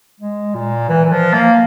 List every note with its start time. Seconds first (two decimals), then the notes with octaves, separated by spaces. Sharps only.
0.20 G#3
0.55 A#2
0.89 E3
1.05 E3
1.12 F3
1.34 A#3